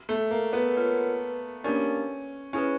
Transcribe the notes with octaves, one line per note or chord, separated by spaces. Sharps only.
A3
A#3
B3
F4 A#4 C#5 F#5
A#3 C#4 D4 G4 A#4 D5
C#4 E4 G#4 B4